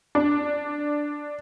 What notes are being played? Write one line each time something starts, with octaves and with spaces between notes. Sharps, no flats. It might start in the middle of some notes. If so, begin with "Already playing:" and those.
D4